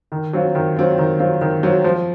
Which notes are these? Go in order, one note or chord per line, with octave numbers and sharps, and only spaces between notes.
D#3
F#3 C4 F4
D#3
F#3 C4 F4
D#3
F#3 C4 F4
D#3
F#3 C4 F4
F3